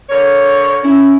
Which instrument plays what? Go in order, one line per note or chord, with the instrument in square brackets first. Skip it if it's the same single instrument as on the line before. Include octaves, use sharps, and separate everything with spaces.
[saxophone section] D3 A#4 C#5
[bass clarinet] C#4 [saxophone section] E4